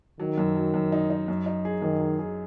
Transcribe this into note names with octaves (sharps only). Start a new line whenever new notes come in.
D#3 F#3
F#2
F#3
F#2
D#4
D#4
F#2
D#4
G#4
F#2 D#3
G#4
G#4